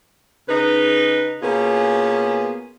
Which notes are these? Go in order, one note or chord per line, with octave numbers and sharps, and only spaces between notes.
C#3 D#4 B4
B2 A#3 B3 C#4 F4 G#4